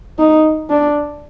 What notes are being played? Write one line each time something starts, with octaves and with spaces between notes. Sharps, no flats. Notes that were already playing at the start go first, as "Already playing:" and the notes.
D#4
D4